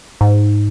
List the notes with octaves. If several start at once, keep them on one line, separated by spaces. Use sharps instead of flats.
G#2